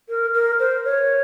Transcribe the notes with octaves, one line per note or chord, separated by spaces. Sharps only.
A#4
A#4
C5
C#5